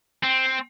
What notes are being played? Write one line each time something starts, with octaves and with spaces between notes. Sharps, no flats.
C4